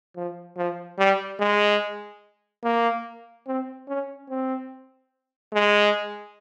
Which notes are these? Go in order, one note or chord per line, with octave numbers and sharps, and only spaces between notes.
F3
F3
G3
G#3
A#3
C4
C#4
C4
G#3